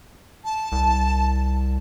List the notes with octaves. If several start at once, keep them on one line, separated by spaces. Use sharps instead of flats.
A5
C2